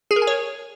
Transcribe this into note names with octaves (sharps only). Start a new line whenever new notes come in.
G#4
A#4
G#5
C#5